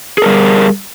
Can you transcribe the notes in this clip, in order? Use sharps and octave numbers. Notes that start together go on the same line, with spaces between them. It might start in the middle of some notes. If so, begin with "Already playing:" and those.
G3 G#4 A#4